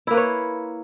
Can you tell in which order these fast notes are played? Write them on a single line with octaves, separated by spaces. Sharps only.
E4 A#3 B4 C#5